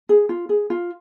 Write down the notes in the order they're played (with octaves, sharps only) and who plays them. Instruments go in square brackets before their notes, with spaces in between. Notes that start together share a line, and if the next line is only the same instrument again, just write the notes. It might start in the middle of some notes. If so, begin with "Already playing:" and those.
[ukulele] G#4
F4
G#4
F4